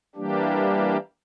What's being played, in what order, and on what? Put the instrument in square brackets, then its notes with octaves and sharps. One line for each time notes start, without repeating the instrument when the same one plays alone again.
[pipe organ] E3 G3 A#3 D4 G4